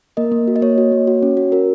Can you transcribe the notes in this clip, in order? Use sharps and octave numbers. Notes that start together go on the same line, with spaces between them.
A#3 A#4 D#5
A#3
F#4
D#5
A#3 C#5
F#4
A#3
F#4
C#4
F#4
F#4 A#4